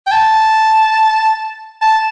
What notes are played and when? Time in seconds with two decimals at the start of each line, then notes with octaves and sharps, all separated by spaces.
0.07 G5
0.12 A5
1.82 A5